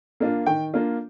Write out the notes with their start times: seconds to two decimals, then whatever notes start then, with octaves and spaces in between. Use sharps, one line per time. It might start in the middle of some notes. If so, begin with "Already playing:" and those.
0.20 A#3 D4 F4
0.46 D#3 G5
0.74 A#3 D4 F4